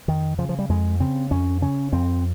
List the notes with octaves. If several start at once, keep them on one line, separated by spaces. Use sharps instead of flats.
F2 D#3
C#3 F3
F3
G3
F2 G#3
C#3 C4
F2 C#4
C#3 C#4
F2 C4